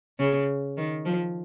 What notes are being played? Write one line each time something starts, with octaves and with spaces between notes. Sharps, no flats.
C#3
D#3
F3